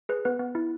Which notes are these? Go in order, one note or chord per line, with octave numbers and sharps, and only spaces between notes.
G#4 B4
B3 B4
B3
E4